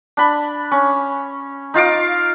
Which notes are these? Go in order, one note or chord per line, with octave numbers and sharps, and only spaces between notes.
D4 B5
C#4
D#4 F4 F5 D6